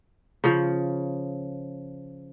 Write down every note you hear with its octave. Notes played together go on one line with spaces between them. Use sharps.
C#3 F3